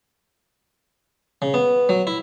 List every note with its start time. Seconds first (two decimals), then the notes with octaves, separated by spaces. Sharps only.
1.42 C#3
1.54 B3
1.89 F#3
2.07 E4